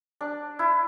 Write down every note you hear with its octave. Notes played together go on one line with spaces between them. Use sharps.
D4
E4